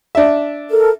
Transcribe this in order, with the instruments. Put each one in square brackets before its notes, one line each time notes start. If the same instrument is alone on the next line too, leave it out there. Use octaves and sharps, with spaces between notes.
[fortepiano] D4 E5
[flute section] A4 A#4